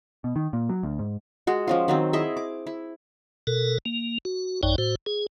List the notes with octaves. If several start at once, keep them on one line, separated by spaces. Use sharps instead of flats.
B2
D#3
A#2
F#3
D2
G#2
G#3 F#4
F3 C#4 F4
D#3 F#3 C4
E4 G#4 D#5 E5
D6
E4
B2 A4 A#4
A#3
F#4
A1 F#2 D#4 C#5 D5 G5
A2 F#4 C5
G#4